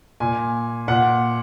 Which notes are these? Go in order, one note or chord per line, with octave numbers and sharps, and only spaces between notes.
A#2 G#5
A#2 F#5